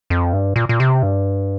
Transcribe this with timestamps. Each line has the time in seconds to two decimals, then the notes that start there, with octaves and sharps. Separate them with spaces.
0.10 F2
0.33 G2
0.56 A#2
0.69 A#2
0.80 C3
1.03 G2